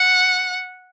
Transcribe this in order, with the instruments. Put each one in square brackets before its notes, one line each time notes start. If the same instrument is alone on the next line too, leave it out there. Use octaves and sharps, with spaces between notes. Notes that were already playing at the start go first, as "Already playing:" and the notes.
Already playing: [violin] F#5